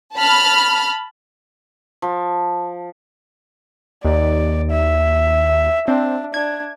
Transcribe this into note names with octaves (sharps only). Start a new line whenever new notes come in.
A5 B5 F6
F3
D#2 D5
E5
C4 D4
D4 G#6